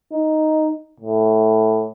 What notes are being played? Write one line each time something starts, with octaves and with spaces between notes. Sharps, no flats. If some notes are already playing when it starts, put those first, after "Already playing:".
D#4
A2